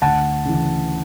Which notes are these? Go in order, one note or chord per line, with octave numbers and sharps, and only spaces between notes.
D2 F#5 A5
C#3 E3